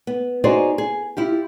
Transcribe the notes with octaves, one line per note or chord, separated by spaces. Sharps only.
B3
D#4 F#4 G#4 C5 D5 D#5
G#4
E4 F4 G4